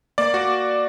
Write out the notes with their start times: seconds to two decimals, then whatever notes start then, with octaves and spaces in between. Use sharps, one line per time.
0.18 A#3 D5
0.34 A#3 F#4